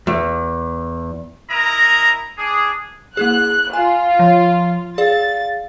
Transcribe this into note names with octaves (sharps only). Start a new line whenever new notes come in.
E2
E4 A#4 D#5 A#5
D4 G#4
A#3 E4 G#4 F#6
F4 G#5
F3
G#4 D5 F5 A6